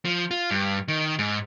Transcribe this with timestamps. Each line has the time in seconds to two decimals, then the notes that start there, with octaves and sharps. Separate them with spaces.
0.05 F3
0.31 F4
0.51 G2
0.88 D#3
1.19 G#2